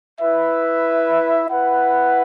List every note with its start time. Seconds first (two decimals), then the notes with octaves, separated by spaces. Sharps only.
0.21 E4 B4 E5
1.49 E4 B4 F#5